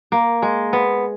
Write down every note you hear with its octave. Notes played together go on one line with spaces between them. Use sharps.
A#3
G#3
B3